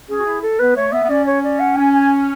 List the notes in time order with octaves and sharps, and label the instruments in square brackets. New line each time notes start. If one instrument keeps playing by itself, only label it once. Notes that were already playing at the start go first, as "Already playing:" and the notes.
[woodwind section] C#4 [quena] G#4
[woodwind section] F#4
E4
[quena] A4
[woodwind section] B3 [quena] B4
[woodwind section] A3 [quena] C#5
[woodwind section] B3 [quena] E5
[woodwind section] B3
[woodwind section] C#4 [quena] D5
[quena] C#5
D5
F#5
[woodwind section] C#4 [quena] G#5
[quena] G#5